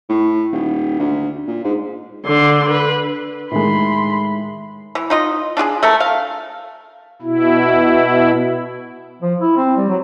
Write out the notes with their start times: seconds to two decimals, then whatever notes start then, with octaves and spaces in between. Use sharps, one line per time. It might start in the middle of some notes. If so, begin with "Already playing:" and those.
0.09 A2
0.52 D#1
0.99 D2
1.47 A#2
1.64 G#2
2.25 D3 C6
2.70 B4
3.51 A2 D#3 G#3 B5 C6
4.95 E3
5.10 D#4 F4 D#5
5.57 D4 F4 G4 G#4
5.83 A3 A4 A#4
6.00 F5
7.22 B2 E4
9.22 F3
9.41 E4
9.57 C4
9.77 G3
9.89 F#3